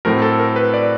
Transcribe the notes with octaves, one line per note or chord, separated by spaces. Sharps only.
A2 F#3 A3 C4 A#4
A4
A#4
B4
D5